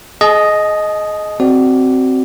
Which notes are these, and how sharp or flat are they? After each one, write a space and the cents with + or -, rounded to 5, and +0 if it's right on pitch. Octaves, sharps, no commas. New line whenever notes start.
G#4 +30 D#5 +0 A5 -35
C4 +0 F#4 +20 D5 +0